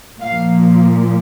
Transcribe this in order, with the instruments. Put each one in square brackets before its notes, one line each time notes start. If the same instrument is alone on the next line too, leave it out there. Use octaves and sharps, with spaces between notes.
[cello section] A#2 F3 A#3 F5